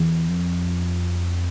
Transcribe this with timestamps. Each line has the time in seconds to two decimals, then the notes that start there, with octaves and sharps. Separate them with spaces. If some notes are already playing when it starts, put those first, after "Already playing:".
Already playing: E2
0.29 F2